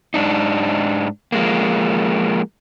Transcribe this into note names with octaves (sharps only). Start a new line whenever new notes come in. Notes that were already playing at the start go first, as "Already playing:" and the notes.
G#2 D4 D#4
F3 G#3 A#3